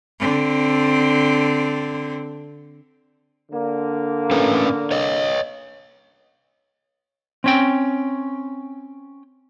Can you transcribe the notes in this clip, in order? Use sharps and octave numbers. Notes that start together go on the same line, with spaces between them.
D3 C4
D3 A#3
C#4 A4 B4
C#5 D#5
C4 C#4 G5